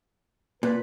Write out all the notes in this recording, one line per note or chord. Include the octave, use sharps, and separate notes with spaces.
A#2 B4